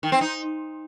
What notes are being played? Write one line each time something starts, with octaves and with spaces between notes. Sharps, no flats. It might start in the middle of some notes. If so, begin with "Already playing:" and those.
D#3
C4
D#4